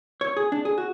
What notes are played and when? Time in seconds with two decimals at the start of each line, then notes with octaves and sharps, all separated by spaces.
0.21 C#5
0.37 G#4
0.52 D4
0.65 G#4
0.78 F#4